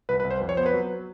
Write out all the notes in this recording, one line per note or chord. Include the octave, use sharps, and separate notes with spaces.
C2 B4
B4
C2
C5
F2
C#5
B3 C5
B4
F#3